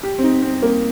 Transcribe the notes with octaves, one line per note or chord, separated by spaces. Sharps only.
G4
C4
D#4
C4
A#3